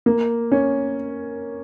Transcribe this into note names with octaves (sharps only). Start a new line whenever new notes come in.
A#3
C#4